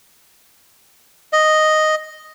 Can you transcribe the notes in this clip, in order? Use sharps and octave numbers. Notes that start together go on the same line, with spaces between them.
D#5